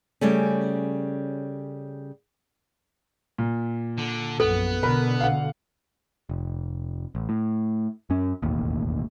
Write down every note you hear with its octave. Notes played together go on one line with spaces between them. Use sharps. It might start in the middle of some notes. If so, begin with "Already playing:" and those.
C#3 G3 A3 C#4
A#2
D3
A#1 F#2 B3 A4
B2 D3 A#4 B4 B5
F5 F#5
F1
A1
A2
F#2 C#4
E1 A1 D#2